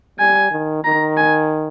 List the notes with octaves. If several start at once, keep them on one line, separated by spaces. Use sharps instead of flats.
G3 G#5
D#3
D#3 A#5
G#5